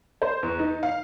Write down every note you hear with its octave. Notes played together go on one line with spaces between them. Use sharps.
C5
E2
D#4
F5